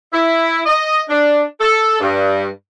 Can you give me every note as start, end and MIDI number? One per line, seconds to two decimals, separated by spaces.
0.13 0.59 64
0.66 0.99 75
1.09 1.42 62
1.61 1.96 69
2.00 2.46 43